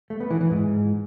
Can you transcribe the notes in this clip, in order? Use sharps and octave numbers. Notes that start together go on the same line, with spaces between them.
A3
B3
E3
E3
G#2